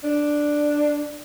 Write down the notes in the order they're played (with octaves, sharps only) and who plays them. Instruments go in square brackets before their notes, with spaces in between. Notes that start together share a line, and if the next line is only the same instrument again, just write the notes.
[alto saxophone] D4